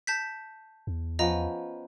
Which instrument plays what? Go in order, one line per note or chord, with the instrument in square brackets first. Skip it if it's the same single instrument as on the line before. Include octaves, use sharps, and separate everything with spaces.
[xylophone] A5 G6 B6
[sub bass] E2
[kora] F3 B3 C#4 [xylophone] D#5 A#5